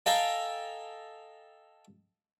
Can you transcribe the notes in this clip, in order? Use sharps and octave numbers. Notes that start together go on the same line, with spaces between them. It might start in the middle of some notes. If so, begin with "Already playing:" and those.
A4 D#5 F5 G5 G#5 A#5